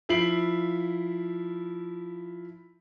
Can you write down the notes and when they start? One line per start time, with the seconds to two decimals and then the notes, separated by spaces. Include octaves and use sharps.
0.09 F3 E4 C7 D7 F#7